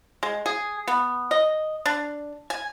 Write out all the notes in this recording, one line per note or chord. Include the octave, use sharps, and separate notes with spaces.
G#3
G#4
B3
D#5
D4
G#5